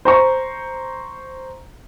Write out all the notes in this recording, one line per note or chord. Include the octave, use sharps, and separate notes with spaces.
C5 A#5 C#6